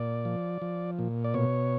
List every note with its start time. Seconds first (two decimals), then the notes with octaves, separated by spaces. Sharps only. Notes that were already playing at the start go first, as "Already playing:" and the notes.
Already playing: A#2 D5
0.25 F3
0.62 F3
0.99 A#2
1.24 D5
1.34 B2 C#5